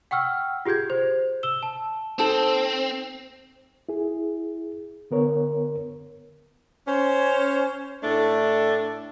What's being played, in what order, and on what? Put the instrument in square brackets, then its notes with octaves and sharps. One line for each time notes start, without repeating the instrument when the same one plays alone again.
[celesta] F#5 G5 C#6 E6 F6
F4 G4 G#4 G6 G#6
C5
E6 E7 G7
A5
[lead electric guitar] C4 [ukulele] D#4 A4
[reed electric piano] E4 G#4
D3 B3 A#4 C#5
[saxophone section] C#4 C5
A2 A3 D4